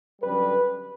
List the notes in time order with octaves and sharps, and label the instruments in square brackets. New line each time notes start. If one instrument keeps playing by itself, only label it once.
[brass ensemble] F#2 D3 G3 B4